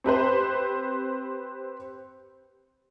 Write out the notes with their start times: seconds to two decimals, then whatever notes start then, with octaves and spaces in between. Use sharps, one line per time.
0.04 C4 G4 B4 C5